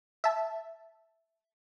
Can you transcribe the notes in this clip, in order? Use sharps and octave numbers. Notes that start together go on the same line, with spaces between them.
E5 A5